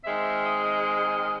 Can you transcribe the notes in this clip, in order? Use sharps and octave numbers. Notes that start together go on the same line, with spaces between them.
D#3 G#3 C4 E5
D#5